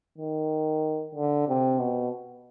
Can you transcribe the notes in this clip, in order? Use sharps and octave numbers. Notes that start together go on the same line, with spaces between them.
D#3
D3
C3
B2